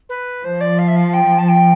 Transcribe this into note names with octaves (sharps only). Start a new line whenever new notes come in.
B4
F3 C5
D5
F5
E5
F5
G5
A5
G5